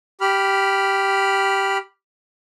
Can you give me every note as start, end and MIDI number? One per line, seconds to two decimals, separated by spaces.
0.21 1.78 67
0.21 1.78 83
0.21 1.78 89